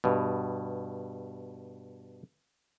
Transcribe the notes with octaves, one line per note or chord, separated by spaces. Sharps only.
G2 B2